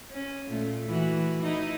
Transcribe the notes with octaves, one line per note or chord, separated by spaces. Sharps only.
C#4
A#2 A3
E3 F#4
D#4 E4